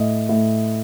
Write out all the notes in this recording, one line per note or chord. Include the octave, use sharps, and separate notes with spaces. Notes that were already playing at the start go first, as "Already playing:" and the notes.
Already playing: A2 D#5
A2